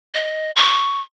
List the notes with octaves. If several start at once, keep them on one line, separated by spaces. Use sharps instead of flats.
D#5
C#6